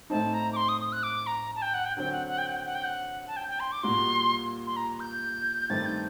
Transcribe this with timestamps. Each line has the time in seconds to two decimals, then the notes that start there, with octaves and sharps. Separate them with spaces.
0.10 A2 A3 C4 D#4 A5
0.34 A#5
0.53 D6
0.56 C6
0.68 D#6
0.81 D#6
0.92 F#6
1.03 D6
1.27 A#5
1.55 A5
1.62 G5
1.74 F#5
1.85 G5
1.97 D3 F#3 C4 G5
2.12 F#5
2.27 F#5
2.38 G5
2.46 F#5
2.56 G5
2.66 F#5
2.75 G5
2.84 F#5
3.27 A5
3.36 G5
3.48 G5
3.60 C6
3.72 D6
3.83 A#2 G3 A#3 F#4 C6
4.67 C6
4.76 A#5
5.00 G6
5.70 G2 D#3 A3 C4 A6
5.86 G6